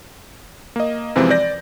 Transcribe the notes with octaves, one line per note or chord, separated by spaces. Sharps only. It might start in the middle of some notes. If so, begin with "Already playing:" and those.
A#3 D#5
F#2 C3 E3 F3 G#3 C4
D5 G6 A#6